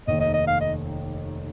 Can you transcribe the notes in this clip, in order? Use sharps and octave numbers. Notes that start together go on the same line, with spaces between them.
F1 D#2 D#3 D#5
D#5
D#5
F5
D#5